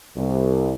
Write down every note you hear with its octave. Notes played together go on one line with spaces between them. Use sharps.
C2